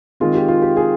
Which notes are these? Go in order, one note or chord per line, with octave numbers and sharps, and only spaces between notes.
D#3 G#3 C4 F4
G4
F4
G4
G#4